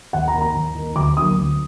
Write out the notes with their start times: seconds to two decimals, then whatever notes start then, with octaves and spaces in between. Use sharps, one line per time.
0.13 D#2 F#5
0.28 A#5
0.34 D#3 A#3
0.41 A#5
0.55 D#2
0.75 D#3 A#3
0.96 D2 D6
1.17 D3 F#3 A#3 D#6
1.38 D2